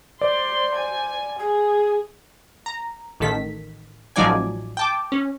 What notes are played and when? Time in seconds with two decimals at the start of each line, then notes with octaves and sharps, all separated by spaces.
0.21 C5 D5 C6
0.76 G#5
1.39 G#4 G#5
2.66 A#5
3.20 A1 D#3 A4 B6
4.16 A1 F3 F#3 D#4 D5 G#5
4.77 G5 A5 D6
5.12 C#4